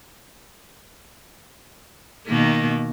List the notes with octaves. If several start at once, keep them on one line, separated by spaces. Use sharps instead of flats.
B2 D#3 A#3